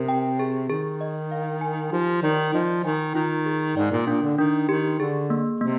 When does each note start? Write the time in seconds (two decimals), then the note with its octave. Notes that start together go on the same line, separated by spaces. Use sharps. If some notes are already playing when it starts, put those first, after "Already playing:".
Already playing: C3 A#4
0.09 G5
0.39 G#4
0.69 D#3 G#4
1.01 D#5
1.32 F5
1.61 G#5
1.92 F3 G4
2.23 D#3 D5
2.54 F3 D#5
2.84 D#3 G#5
3.15 D#3 F4
3.46 G#4
3.77 G#2 D5
3.92 A#2
4.07 A#2 D4
4.23 D3
4.38 D#3 D4
4.69 D#3 G4
5.00 D3 G#4
5.30 A#3
5.61 C3 A#3